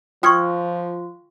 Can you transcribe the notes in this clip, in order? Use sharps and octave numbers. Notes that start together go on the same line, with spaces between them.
F3 F4 G5 C#6 D#6 F6 G#6